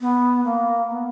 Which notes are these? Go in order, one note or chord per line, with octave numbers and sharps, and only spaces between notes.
B3
A#3
B3